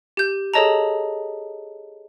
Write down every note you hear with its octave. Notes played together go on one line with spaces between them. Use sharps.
G4 G6
G#4 A4 C#5 D#5 A5 A#5